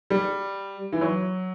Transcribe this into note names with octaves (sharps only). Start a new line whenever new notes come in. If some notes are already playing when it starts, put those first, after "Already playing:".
G3
E3
F#3